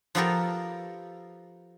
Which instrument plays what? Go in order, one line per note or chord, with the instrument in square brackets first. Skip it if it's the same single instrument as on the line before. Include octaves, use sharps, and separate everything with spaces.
[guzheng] F3 B3 F4 G4 A4 A#4